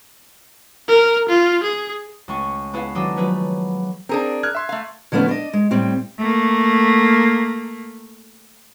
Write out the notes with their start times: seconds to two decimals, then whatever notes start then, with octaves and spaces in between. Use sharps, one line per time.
0.88 A#4
1.29 F4
1.63 G#4
2.28 C#2 A3 C#4 G#5 C#6
2.73 B3 E4 G#4 A4 F5
2.95 D#3 F#3 D4 G#4 A4 D#5
3.17 F3 F#3 A3 G#4 B4 C#5
4.09 C4 D4 G#4 A#4
4.43 F6 F#6 G#6
4.55 E5 C6
4.69 A3 F5
5.12 D3 F3 A3 B3 C#4 E4
5.29 D4 D#5
5.53 G#3
5.71 A2 G3 C4
6.19 A3 A#3